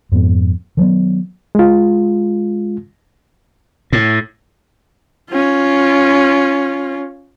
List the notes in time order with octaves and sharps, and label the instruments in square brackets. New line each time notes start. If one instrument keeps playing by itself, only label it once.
[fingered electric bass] F2 G#2 G#3 B3
D#3 F#3 G#3 B3
[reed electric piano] G#3 F4
[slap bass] A2
[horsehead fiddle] C#4 F4